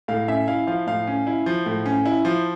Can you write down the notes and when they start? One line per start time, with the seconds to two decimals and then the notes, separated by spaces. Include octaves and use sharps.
0.08 A2 F5
0.28 C#4 E5
0.48 E4 F5
0.67 F3 F5
0.87 A2 F5
1.07 C#4
1.27 E4
1.46 F3
1.66 A2
1.86 C#4
2.06 E4
2.25 F3